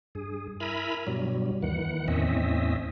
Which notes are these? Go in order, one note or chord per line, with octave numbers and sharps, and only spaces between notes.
G2 G#4
E4 A#4 E5 G#5 A#5 B5
G2 B2 F#3 G3
D#2 D#3 E3 F#5
E2 A2 C4 C#4 D#5 E5